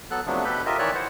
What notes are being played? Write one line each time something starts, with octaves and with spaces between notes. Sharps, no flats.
F#3 B3 A4 F#6
C3 F3 F#3 A3 B3 D4
B2 G4 A4 B4 B5 G6
F4 G4 A#4 D#5 E5
D#3 E3 C#5 D5 E5 F#6
E4 C5 F#5